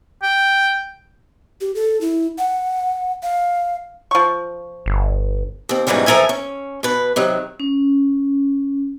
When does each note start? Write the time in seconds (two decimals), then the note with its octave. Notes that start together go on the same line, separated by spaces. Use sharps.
0.23 G5
1.61 G4
1.75 A4
2.01 E4
2.38 F#5
3.23 F5
4.11 F3 C#6
4.86 G1
5.69 D#2 C4
5.87 G#2 B2 E3 F#3 G3 C#4
6.06 E3 F3 A4 A#4 E5 G#5
6.29 C#4
6.83 B2 B4
7.16 C3 D#3 F#3
7.60 C#4